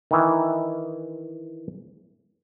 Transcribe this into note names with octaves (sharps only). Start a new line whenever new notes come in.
D#3 E3